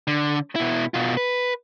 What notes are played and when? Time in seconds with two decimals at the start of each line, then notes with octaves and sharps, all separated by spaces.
0.07 D3
0.56 B2 E4
0.94 B2 F4
1.17 B4